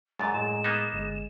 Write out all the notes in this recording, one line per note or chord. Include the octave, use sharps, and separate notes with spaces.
F#2 A#2 G#3 F#5 A6
A2 G#3 E7
A#3 B3 D#4
G1 G#3